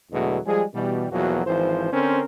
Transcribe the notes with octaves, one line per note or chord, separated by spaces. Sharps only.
E2 B2 D3 F#3 G#3 A3
F3 G3 G#3 G#4
B2 E3 G3
E2 B2 F3 F#3 A#3 F#4
G#1 E3 F3 C5
D3 C4 C#4 A#4 C5